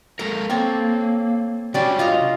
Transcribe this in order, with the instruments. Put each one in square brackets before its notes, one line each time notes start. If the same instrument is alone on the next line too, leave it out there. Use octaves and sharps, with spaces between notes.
[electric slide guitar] G#3 A4 A#4 [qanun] A#5
[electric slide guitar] A#3 [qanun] C4 A4 C#5
[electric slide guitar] C3 D4 F#4 [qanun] G3 C#4 D5
[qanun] F4 D#5 A#5